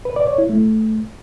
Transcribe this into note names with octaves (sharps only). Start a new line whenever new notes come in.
B4
D5
C#5
E4
A3